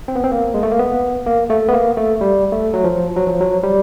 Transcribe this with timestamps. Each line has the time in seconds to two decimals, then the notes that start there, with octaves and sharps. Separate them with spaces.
0.08 C4
0.16 B3
0.24 C4
0.32 A#3
0.54 G#3
0.63 A3
0.71 A#3
0.79 B3
1.26 A#3
1.50 A3
1.68 B3
1.74 A#3
1.97 A3
2.21 G3
2.52 A3
2.74 F#3
2.84 F3
3.16 F#3
3.27 F3
3.40 F#3
3.63 G3